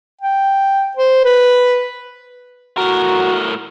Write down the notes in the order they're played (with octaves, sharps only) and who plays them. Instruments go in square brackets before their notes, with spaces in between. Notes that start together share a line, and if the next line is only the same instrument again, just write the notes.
[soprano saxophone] G5
C5
B4
[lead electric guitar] A2 A#4 [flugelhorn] F#4